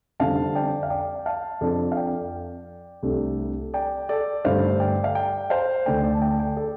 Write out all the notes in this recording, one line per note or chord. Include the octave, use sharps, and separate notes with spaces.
F2 D3 G3 C4 F5 A5
D5 G5
F5
D5 G5
F5 A5
F2 F3 D4 A4 D5
F5
D5 G5
C2 C3 A3 D4
D5 G5
A4 D5
G2 D3 A3 C5 F5
D5 G5
F5
D5 G5
C5 F5
D2 D3 A3 D5 G5
D5 G5
A5
D5 G5
D5 G5
A4 D5